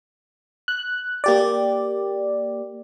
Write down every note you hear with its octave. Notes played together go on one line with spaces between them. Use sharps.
F#6
A#3 G4 D5